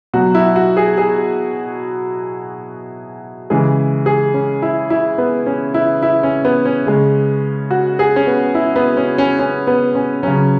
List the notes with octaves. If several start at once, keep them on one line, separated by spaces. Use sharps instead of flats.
B2 F#3 F#4
E4
F#4
G#4
G#4
C#3 E3 G#3 G#4
G#4
C#4
E4
E4
B3
C#4
E4
E4
C#4
B3
C#4
C#3 G#3
F#4
G#4
C#4
B3
E4
B3
C#4
C#4
C#4
B3
C#4
C#3 F#3 C#4